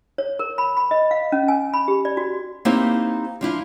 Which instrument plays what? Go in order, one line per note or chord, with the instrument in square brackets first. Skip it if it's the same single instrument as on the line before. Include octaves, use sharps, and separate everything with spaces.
[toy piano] C#5
A#4
B5
B5
D#5
F5
C#4
G#5
B5
G4
D5
F#4
[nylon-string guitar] A#3 C4 D#4 E4 G4 C5
F3 D4 E4 F4